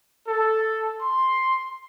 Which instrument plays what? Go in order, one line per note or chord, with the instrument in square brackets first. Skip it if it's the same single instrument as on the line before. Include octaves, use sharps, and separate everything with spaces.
[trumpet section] A4
C6